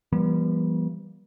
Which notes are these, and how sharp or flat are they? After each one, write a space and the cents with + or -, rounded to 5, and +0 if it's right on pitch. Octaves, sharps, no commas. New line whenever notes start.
E3 +45 G3 +0 B3 -40